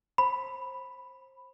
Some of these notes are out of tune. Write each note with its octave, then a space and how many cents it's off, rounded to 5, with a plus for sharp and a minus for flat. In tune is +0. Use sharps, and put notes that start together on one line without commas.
C5 +25 B5 +0